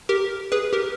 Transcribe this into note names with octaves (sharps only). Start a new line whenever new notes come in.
G4 A#4
G#4 B4
G4 A#4